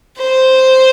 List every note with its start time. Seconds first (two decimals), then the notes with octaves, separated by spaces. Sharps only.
0.18 C5